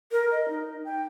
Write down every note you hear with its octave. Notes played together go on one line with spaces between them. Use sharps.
A#4
D#5
D#4
G5